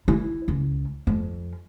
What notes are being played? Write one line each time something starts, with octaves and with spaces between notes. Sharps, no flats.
E4
C#2
F2